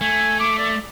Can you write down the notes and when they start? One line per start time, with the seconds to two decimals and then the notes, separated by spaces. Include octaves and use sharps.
0.01 A3 G#5
0.40 D6
0.59 D5